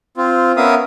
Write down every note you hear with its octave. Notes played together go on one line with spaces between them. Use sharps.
C4 F4
B3 C#4 A#4 E5 F5 D#6